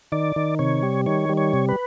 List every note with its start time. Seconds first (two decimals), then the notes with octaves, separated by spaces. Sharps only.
0.12 D#3 D5
0.36 D#3
0.59 C3 C#5
0.83 G3
1.06 D#3 C#5
1.29 G3
1.37 C#5
1.54 C3
1.69 B4